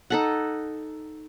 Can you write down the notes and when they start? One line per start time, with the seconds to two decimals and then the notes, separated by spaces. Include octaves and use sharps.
0.10 D#4 A4 F#5